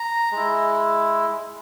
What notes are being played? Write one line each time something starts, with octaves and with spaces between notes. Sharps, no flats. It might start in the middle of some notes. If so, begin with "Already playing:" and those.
Already playing: A#5
G#3 E4